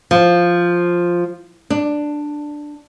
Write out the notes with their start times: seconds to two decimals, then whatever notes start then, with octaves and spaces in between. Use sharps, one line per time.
0.11 F3
1.70 D4